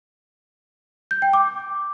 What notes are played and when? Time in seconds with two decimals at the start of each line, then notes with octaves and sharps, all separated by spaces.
1.11 G6
1.22 G5
1.33 D6